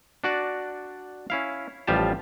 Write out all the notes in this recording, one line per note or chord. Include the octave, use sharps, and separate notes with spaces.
D4 F#4 D5
C#4 E4 F5
A1 F3 G3 F4 G4 A5